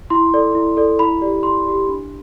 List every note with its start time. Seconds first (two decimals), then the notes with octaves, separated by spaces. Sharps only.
0.10 E4 C6
0.34 A4 D5
0.55 E4
0.77 A4 D5
0.99 E4 B5
1.21 G4 D5
1.43 E4 C6
1.65 G4 D5
1.88 D4